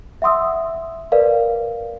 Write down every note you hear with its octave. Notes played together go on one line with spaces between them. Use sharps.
E5 F#5 C6 D#6 E6
A#4 B4 D5 F5